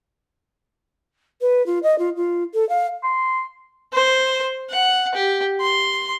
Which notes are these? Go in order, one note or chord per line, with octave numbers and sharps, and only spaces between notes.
B4
F4
D#5
F4
F4
A4
F5
C6
C5
F#5
G4
C6